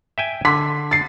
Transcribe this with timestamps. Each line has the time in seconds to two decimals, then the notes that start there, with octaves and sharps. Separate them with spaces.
0.18 E5 G5 G#5
0.45 D3 C6 B6
0.91 A6 C7